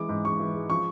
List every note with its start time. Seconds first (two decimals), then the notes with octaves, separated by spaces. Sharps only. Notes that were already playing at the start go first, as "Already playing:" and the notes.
Already playing: E3 G#3 D6
0.09 G#2
0.25 G#2 C#6
0.40 E3
0.55 G#3
0.70 F3 C#6